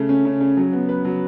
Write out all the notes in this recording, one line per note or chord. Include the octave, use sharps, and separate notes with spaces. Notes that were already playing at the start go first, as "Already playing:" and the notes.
Already playing: C#3 A3
C#4
C#3
C#3
F#3
B3
B4
F#3